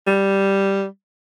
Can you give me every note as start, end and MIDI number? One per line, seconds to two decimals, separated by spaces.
0.07 0.85 55